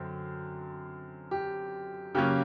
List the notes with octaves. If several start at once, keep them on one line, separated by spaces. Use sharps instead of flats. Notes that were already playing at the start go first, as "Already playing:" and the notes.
Already playing: F#2 D3 C4
G4
C#3 F#3 A#3 C#4 G4